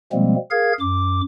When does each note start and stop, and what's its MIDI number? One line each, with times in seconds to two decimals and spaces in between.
0.13 0.36 47
0.13 0.36 53
0.13 0.36 55
0.13 0.36 56
0.13 0.36 58
0.13 0.36 60
0.51 0.73 68
0.51 0.73 70
0.51 0.73 77
0.51 0.73 92
0.80 1.21 42
0.80 1.21 86